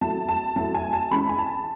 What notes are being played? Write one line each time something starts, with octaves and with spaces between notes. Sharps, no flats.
F#3 A3 E4 A5
A5
F#3 A3 E4 A5
G#5
A5
E3 G#3 C#4 E4 B5
G#5
A5